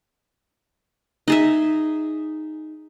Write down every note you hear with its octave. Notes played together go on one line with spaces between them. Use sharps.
D#4 G#4 E5